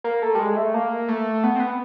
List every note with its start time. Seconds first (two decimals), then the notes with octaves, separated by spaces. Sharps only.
0.04 A#3
0.22 A3
0.35 G3
0.39 G#3
0.57 A3
0.74 A#3
1.08 A3
1.44 B3
1.56 C4
1.60 B3